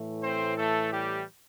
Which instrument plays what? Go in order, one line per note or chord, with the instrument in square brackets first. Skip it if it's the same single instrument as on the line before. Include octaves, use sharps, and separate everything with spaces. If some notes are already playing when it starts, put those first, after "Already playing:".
Already playing: [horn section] A2 E3 A3
C4 C5
A3 A4
G3 G4